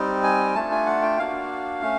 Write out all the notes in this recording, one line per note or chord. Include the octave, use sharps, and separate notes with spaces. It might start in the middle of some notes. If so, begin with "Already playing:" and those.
Already playing: G3 C4 D#4
G#5
A3 D4 F4 A5
G#5
F#5
G5
A#3 D4 F#4 F5
A3 C#4